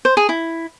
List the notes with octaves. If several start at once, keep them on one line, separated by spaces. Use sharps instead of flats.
C5
G#4
E4